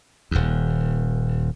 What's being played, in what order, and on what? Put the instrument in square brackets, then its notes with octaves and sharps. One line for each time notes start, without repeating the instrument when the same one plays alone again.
[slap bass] D#1 D#2